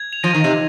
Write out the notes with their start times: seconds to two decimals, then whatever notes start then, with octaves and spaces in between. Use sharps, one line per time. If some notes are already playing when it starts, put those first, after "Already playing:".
Already playing: G#6
0.13 F7
0.23 F3 A#6 D#7
0.35 D#3
0.44 C3